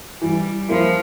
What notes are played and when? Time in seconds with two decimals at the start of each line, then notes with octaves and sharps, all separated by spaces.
0.21 E3 G3
0.68 F3 A#3 E4